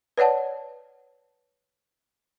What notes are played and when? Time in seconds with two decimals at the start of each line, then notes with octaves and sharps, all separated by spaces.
0.18 B4 C#5 D5 F#5 A5